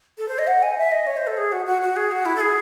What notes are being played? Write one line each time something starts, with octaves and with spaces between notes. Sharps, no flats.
A4
C5
D#5
F#5
G#5
E5
D#5
C#5
C5
A4
G#4
F#4
F#4
F#4
G#4
F#4
E4
A4
G#4